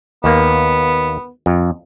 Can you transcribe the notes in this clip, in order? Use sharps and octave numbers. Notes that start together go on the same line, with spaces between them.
D#2 A#3 B3
F2